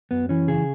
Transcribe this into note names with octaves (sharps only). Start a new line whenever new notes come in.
F#2 B3
E3 C#4
C#3 G#4